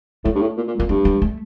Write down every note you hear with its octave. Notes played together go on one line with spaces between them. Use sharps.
A2 A3
G2
A2
A#2
A#2
A#2 A#3
G2 A3
G3
A3